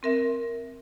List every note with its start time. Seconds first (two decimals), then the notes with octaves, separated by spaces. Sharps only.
0.03 C4 A#4 E5